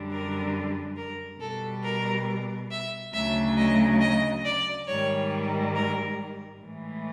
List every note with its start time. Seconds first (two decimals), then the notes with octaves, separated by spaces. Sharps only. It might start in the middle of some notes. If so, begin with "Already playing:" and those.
Already playing: F#2 D3 G3
0.10 A#4
0.96 A#4
1.40 B2 G3 A4
1.84 A#4
2.71 E5
3.14 D2 C#3 F#3 A3 E5
3.57 D#5
4.01 D#5
4.44 D5
4.87 G#2 D#3 G3 C#5
5.75 A#4
6.61 A2 E3 G#3